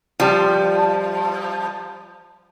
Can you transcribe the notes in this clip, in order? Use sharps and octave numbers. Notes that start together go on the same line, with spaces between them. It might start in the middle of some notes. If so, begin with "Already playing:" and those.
F3 G3